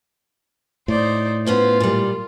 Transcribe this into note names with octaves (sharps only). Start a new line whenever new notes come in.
A2 D#4 C5 D5
B3 C#4 F4 C5
A#2 G3